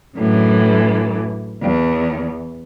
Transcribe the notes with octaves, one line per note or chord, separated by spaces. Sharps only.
F#2 A2 D3 E3
E2